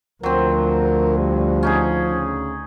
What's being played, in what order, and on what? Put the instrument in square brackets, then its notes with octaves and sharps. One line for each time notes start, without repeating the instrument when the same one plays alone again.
[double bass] D2 [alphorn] F3 [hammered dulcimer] F#3 C4 [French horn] A#4
[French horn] G3
[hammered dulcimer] C#4 D#4 G#4
[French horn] C#3